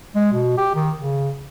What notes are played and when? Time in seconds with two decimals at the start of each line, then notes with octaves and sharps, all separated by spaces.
0.15 G#3
0.32 B2
0.58 G4
0.75 D#3
0.99 C#3